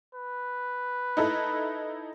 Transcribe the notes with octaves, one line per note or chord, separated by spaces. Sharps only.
B4
D#4 E4 A4